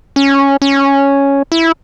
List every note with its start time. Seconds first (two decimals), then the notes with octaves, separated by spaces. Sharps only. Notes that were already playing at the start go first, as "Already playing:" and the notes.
0.16 C#4
0.62 C#4
1.52 E4